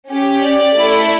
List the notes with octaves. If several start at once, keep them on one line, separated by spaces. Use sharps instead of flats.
C#4 G4
D5
A3 E4 A4